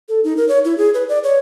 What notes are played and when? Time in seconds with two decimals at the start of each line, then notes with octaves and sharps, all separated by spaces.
0.09 A4
0.24 D#4
0.37 A#4
0.49 C#5
0.65 E4
0.78 G#4
0.94 B4
1.09 D5
1.24 C#5